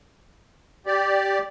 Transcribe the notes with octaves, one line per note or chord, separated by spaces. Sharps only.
G4 D5